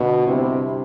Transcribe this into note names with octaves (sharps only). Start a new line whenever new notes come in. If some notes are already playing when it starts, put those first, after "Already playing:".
Already playing: B2 D3
C3 G3 C4 E4